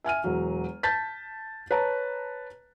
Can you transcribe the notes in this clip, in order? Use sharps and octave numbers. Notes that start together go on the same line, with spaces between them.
E5 G#5 F6 D#7
E1 F#3
A5 G6 A6 B6
B4 C#5 A5 A#5